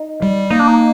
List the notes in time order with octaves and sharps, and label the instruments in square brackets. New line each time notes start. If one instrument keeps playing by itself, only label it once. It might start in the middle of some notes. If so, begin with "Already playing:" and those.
Already playing: [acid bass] D#4
[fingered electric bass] G3
[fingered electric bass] A#3 [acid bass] D#4
[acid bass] D4
D#4